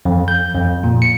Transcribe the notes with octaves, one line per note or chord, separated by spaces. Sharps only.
F2
G6
F2
A#2
C#7